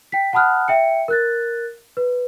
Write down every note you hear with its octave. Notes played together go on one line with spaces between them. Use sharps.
G5 B6
F#5 A5 B5 D#6 F6 F#6
E5 G5 C#7
A#4 F#6 A6
B4